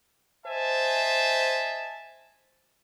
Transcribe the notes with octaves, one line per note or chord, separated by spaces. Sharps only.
C5 D#5 E5 G#5 A5